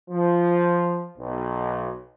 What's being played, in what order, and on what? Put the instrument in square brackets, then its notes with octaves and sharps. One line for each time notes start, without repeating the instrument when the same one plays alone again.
[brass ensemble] F3
B1